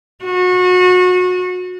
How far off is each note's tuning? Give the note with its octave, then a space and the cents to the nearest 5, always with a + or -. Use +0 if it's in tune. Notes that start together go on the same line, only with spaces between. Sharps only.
F#4 -30